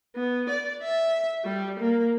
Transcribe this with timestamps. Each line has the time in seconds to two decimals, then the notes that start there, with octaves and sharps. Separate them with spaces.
0.16 B3
0.49 D5
0.82 E5
1.44 G3
1.79 A#3